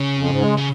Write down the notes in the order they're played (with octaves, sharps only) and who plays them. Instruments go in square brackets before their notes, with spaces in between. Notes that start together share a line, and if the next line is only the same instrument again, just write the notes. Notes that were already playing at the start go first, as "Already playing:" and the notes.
Already playing: [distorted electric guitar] C#3
[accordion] F2
G#2
G#3
[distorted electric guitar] C#3